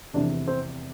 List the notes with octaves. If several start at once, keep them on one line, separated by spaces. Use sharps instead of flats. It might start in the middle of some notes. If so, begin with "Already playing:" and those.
F1 E2 C3 D4
C4